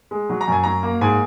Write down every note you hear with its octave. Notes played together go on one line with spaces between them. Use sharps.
G#3
F#3
A#5
F#2 G#5
F#3 A#5
A#3
G#2 G#5